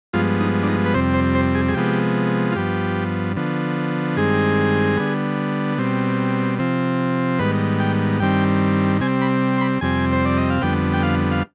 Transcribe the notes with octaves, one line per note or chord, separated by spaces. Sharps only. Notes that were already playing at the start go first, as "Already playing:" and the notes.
G2 F3 G#3 B3 F4
D#4
D4
D#4
B4
F2 C3 G3 C4 C5
C5
C5
G#4
G#4
C3 F3 G#3 B3 G4
F4
G2 F3 B3 G4
D3 F3 B3
G2 D#3 G#3 C4 G#4
D3 G3 B3
B2 G3 C4
C3 F3 C4
G#2 D#3 G3 B3 B4
G5
G2 D#3 G3 C4 G5
C3 G3 C4 G#5
B5
C6
B5
F2 C3 G3 C4 G#5
C5
D5
D#5
F5
F2 D3 G3 B3 G5
G5
F5
F5